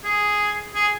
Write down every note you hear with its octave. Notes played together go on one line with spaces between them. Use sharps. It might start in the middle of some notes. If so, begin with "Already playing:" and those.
G#4
G#4